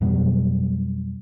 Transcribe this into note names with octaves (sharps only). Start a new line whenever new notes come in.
F2 B2 F#3 G3